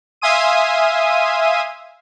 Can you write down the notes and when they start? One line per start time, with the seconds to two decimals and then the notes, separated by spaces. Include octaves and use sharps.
0.21 E5 F5 G#5 C6 D#6 D#7